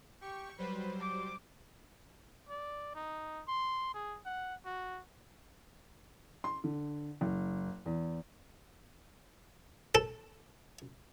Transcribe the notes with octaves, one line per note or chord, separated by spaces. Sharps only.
G4 C#6
F#3 G3 B4 C5
D6
D5
D#4
C6
G#4
F#5
F#4
C6
D3
F#1
E2
A4